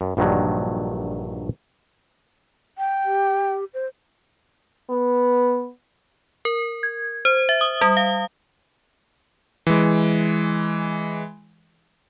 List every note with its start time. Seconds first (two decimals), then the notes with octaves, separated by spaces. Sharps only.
0.01 F#2
0.17 A#1 G2 D3 D#3 F#3
2.78 G5
3.05 G4
3.74 C5
4.89 B3
6.45 A#4
6.83 G#6
7.25 C5
7.49 E5
7.61 D#6
7.81 G3
7.97 F5
9.67 E3 G#3